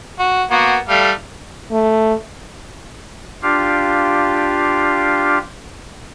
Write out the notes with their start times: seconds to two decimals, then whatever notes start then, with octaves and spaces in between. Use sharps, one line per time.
0.19 F#4
0.51 A#3 B3 F#4
0.89 G3 A3 F5
1.71 A3
3.42 D4 F4 G4 F5